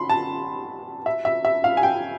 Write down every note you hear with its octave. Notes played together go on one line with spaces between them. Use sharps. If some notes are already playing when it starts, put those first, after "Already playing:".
Already playing: B5 C6
A5
E5
E5
E5
F5
G#5
G5